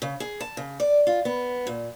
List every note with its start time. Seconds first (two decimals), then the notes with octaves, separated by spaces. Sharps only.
0.02 C#3
0.20 G#4
0.40 A5
0.57 C#3
0.80 D5
1.07 F4
1.25 B3
1.67 A#2